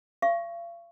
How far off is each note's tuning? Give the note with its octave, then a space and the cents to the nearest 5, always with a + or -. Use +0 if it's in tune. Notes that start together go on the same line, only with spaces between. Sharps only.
F5 -40 C#6 +0